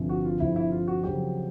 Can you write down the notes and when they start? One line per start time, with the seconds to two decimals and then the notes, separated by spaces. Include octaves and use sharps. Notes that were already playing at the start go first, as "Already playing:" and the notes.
Already playing: G1 F2 C3 F3
0.09 F#4
0.25 F4
0.40 G1 F2 C3 F3 E4
0.56 E4
0.72 F4
0.87 F#4
1.03 F2 C#3 F#3 G4